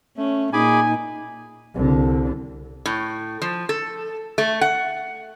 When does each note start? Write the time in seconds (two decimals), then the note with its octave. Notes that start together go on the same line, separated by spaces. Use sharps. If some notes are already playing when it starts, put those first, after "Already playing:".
0.17 A3 C#4
0.53 A#2 D#4 G#4 G#5 B5 D6
1.75 C2 D3
2.86 A2
3.42 F3
3.69 A4
4.38 A3
4.61 F#5